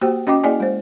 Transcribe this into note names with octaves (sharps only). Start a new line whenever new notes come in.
A#3 F#4 G4 C5 G5
C#4 F#4 D#5 G5 D6
A#3 E4 G#4 D5 D#5 G#5
G#3 C5